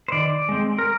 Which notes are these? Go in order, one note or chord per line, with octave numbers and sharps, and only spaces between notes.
C5
D#3 D5
G#3 C4
A#4